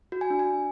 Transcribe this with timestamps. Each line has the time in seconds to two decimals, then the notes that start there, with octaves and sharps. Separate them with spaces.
0.12 F#4
0.21 G#5
0.30 D4
0.39 G#5